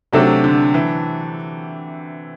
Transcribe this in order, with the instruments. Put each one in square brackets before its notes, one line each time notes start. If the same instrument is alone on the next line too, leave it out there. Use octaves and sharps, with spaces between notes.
[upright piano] C3 [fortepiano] F#3 A3 D4 F#4 A4
[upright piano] D3
E3